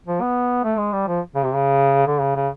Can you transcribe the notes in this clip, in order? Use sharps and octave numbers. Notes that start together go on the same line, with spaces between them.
F3
B3
A3
G#3
G3
F3
C#3
C3
C#3
D3
C#3
C#3